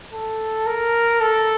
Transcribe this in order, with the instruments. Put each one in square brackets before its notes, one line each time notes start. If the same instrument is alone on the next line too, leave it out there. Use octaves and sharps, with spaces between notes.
[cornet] A4
A#4
A4